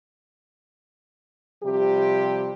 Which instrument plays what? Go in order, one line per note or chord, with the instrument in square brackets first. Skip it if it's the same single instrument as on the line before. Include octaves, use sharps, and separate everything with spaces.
[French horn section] C3 F3 G3 G4